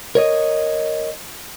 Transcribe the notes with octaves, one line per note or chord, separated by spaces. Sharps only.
A#4 C#5 D#5